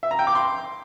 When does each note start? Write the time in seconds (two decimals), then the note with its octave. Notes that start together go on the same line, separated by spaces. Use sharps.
0.03 E5
0.11 A#5
0.19 G5
0.27 D6
0.35 C6